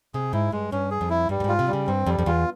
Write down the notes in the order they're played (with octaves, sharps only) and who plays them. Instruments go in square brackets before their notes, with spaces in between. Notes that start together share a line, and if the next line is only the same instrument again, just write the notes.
[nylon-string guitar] C3 [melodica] G#4
[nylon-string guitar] G#2 [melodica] E4
[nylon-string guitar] G2 [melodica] G#3
[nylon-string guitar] G2 [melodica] C#4
[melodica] G#4
[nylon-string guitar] F2
[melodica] E4
[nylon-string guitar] G2 [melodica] G3
[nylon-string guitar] G2
[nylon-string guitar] G#2 [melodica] F4
[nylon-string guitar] C3
[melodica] G3
[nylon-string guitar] C#3
[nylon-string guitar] G2 [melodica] C4
[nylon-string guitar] F2 [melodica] G3
[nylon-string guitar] F2
[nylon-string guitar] E2 [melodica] F4